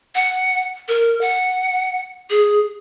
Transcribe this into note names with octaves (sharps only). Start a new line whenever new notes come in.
F#5
A#4
F#5
G#4